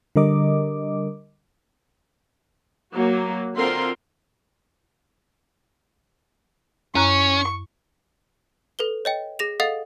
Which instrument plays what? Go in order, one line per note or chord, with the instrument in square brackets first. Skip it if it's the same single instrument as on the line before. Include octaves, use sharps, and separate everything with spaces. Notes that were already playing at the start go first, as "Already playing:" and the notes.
[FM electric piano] D3 G3 A#4 D#5 D6
[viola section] F#3 A#3 F#4
D3 C4 F4 A#4 C6
[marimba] F#2 A#5 F#6 [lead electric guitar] C#4 [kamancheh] C#6
[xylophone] A4 B4 G7
C#5 D#5 G5
G#4 A#6 F7
A4 D#5 F5 F#5 D#6 A6